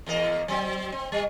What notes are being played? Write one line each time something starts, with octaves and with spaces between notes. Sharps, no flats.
E2 A#3 D#5
F#3 C4
C4
G3